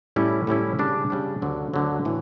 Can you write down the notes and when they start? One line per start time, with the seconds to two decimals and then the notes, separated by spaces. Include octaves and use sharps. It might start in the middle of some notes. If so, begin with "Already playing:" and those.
0.16 A2 G3 C#4 E4
0.47 A2 G3 C#4 E4
0.79 C#3 G3 D4
1.10 C#3 G3 D4
1.42 D2 D3 F#3
1.74 D2 D3 F#3
2.05 A2 E3